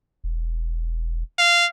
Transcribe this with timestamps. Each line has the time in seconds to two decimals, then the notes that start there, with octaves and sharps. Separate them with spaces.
0.24 E1
1.39 F5